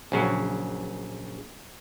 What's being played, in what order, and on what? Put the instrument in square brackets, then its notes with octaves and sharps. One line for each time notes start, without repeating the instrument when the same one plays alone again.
[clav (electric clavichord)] A#1 C#3 F#3